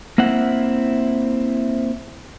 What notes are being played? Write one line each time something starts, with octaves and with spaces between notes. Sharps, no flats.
A#3 C4 E4 F#5